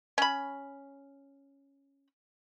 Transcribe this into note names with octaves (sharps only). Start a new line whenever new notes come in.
C#4 B5